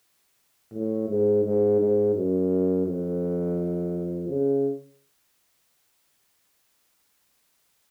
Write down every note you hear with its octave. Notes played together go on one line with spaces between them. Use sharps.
A2
G#2
G#2
G#2
F#2
F2
C#3